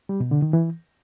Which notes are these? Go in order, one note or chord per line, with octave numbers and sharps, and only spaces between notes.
G3
B2
D3
D#3
E3